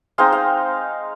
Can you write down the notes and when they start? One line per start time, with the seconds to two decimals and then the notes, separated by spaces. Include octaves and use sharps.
0.18 G#3 C4 D#4 F5
0.32 F5